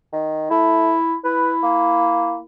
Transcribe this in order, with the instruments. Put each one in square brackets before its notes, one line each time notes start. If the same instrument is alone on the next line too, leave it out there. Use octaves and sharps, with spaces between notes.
[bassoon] D#3
[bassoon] A3 [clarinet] E4
[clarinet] E4 [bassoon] B4
[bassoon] A#3